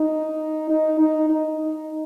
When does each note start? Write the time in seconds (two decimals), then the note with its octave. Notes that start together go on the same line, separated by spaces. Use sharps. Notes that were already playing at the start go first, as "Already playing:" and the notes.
Already playing: D#4
0.70 D#4
0.99 D#4
1.30 D#4